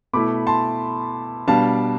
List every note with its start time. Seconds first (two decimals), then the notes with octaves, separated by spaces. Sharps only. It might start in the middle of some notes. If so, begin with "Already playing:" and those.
0.13 B2 A3 E4 B5 D6
0.47 A5 C6
1.47 B2 G3 D4 F5 A5